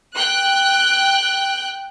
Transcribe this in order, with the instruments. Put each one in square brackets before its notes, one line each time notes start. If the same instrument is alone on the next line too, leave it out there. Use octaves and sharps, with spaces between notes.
[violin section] G5 F#6